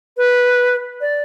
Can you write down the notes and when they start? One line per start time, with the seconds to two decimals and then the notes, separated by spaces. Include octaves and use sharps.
0.17 B4
1.01 D5